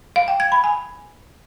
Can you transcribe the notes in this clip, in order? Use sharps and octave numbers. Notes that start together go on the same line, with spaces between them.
F5
G5
G#6
B5
G#5